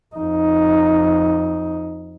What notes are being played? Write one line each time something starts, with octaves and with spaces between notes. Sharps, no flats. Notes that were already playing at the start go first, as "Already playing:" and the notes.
F2 D#4